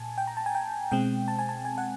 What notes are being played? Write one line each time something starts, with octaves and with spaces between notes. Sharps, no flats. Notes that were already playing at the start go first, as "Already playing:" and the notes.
Already playing: A#2 G#5 A5
G5
A#5
A5
G#5
G5
B2 G#3 C4 G5
A5
G#5
A5
G#5
F#5